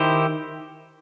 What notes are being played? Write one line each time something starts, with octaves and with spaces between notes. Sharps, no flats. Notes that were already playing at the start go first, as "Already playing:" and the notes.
Already playing: D#3 E4 G4 C5